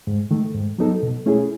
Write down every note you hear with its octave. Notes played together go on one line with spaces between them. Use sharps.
G#2
D#3 A3
G#2
F#3 B3 D#4 A4
B2
A3 C#4 E4 G#4